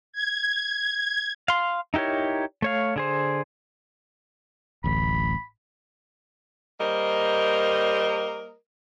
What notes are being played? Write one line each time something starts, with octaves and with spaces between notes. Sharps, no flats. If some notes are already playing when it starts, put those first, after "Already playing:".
G#6
F5 C6
D#4 E4 G4 A#4 C#5
A3 C#5 F5
D3 G#4 C5
D1 A1 B5
G3 A#3 A#4 C5 D#5